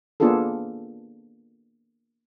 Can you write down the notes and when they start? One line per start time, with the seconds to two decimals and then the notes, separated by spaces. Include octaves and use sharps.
0.20 A#3 B3 D4 F4 G#4 A4